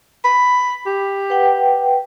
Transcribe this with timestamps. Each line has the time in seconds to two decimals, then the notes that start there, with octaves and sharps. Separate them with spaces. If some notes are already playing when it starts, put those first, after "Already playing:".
0.25 B5
0.86 G4
1.30 B4 F#5 G5